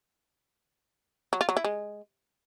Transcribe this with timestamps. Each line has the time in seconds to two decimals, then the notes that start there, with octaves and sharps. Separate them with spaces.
1.33 F#3
1.41 F4
1.49 F#3
1.57 E4
1.65 G#3